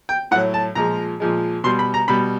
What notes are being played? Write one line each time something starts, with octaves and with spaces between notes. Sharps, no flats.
G5
A2 F#3 F#5
A5
A#2 F3 G#3 A#5
A#2 F3 G#3
B2 G3 C6
B5
A#5
B2 G3 B5